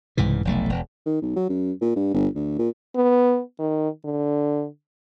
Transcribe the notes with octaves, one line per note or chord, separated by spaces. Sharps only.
C2 G#2 C#3 E3
F1 B1 A3
E1
D#3
B1
F#3
F#2
A#2
G2
G1
D2
A#2
B3
D#3
D3